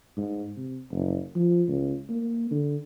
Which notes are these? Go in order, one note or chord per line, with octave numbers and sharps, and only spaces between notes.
G#2
C3
F#1
F3
C#2
A#3
D3